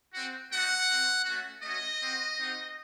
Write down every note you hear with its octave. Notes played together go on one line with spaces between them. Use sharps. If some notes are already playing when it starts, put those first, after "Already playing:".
C4 F#4
A3 D#4 F#4 F#5
C4 F#4
A3 C#4 F#4
A3 C#4 F#4 D#5
C4 F#4
C4 D#4 F#4